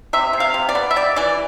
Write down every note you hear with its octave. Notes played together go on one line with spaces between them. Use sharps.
C3 E5
C3
F5
C3
D5
B3
E5
G3 D5
E3 D5